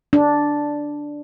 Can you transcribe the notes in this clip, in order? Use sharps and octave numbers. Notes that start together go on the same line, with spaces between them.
D4